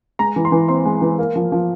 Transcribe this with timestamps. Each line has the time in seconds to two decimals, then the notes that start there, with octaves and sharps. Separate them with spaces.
0.19 G#3 A#5
0.36 E3
0.45 C6
0.52 E3
0.68 C4 C6
0.85 G#3
1.02 E3
1.19 A#3
1.36 F3
1.52 F3